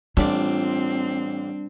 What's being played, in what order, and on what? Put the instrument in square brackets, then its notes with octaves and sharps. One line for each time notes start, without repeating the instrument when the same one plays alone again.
[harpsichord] A1 D5 [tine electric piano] G3 D4 [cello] C4 [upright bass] F4